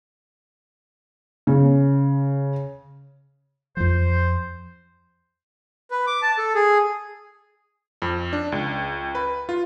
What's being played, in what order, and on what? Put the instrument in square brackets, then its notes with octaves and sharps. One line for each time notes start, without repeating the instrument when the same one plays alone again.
[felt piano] C#3
[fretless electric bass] F2 F3 [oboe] C5
[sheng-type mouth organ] B4
D6
A5
A4
G#4
[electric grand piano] F2
D4
C#2
B4
F4